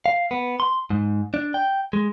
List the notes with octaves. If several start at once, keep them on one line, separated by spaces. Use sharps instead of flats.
F5
B3
C6
G#2
D4
G5
G#3